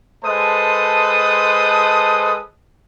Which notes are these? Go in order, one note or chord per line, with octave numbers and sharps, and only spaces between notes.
G#3 A4 B4 C5 A5 D#6